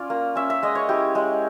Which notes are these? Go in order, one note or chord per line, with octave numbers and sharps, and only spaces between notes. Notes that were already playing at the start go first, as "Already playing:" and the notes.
Already playing: C#4 F4 D5
A#3
C#4 E5
E5
G#3 D#5
C#5
E4 G4
G#3